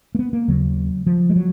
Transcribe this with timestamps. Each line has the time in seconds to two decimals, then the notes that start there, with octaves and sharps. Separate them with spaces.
0.15 A#3
0.19 B3
0.33 A#3
0.48 D#2 C#3 F#3
1.07 F3
1.29 G#3
1.36 F#3